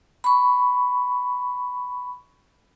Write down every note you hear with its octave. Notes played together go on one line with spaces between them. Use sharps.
B5 C#6